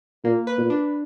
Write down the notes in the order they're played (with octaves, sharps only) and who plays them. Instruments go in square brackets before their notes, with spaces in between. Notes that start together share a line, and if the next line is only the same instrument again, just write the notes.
[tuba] A#2 [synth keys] A#3
[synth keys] B4
[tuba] A#2
[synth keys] D4